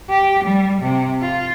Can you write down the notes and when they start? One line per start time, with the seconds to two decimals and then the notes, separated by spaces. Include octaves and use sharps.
0.10 G4
0.44 G3
0.82 C3
1.21 F4